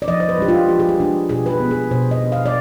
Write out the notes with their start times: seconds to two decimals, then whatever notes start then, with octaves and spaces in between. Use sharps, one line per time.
0.02 D5
0.08 F3 D#5
0.20 C5
0.29 B4
0.38 G#3 D4 G4
0.48 F4
0.69 F3 G4
0.79 G#4
0.89 G4
1.00 G#3 D4
1.29 B2 G#4
1.46 B4
1.50 G#4
1.60 B3 D4
1.71 G#4
1.90 B2 C5
2.11 D#5
2.22 B3 D4
2.32 F5
2.46 D5